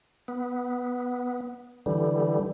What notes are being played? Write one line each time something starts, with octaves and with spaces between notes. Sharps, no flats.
B3
D3 E3 G3